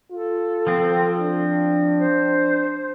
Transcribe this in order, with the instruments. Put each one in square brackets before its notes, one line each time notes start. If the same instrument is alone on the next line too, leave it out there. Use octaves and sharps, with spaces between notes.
[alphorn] F4 [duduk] A4
[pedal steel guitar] F3 C4
[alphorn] D4
[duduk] C5